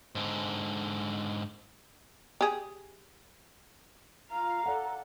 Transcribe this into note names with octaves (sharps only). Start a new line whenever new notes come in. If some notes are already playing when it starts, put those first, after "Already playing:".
G#2 D3
G4 G#4
F4 F5 A#5
A4 D5 F5 F#5